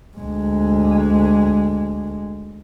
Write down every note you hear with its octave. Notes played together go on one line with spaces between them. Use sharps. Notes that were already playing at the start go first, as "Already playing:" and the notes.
D2 G#3